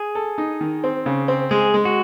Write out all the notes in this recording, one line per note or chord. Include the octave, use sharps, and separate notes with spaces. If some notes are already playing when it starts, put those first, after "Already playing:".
Already playing: G#4
A4
D#4
D#3
C4
C#3
C4
G#3 G#4
G#3
F#4